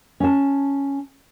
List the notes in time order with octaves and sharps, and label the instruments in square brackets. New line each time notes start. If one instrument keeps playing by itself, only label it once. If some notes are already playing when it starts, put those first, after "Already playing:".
[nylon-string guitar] C#4 A5